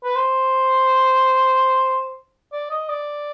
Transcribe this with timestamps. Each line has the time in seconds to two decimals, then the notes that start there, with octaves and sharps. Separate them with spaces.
0.04 B4
0.15 C5
2.53 D5
2.70 D#5
2.89 D5